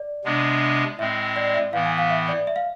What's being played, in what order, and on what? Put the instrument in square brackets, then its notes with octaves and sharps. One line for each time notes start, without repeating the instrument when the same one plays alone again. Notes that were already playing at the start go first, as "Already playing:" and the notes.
Already playing: [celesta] D5
[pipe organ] C3 G#3 B3 D4
[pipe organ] A2 G#3 C4 [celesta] E5
[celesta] D5
D5
E5
[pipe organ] A2 E3 B3 [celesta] F5
[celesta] G#5
F5
E5
D5
E5
F5